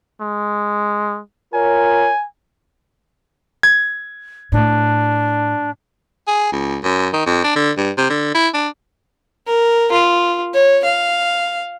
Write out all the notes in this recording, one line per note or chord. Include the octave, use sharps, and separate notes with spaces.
G#3
F4 A#4 C#5 G#5
G#6
A2 D4
G#4
C#2
F#2
D#3
F2
D4
D3
G2
C3
D3
E4
D4
A#4
F4
C#5
F5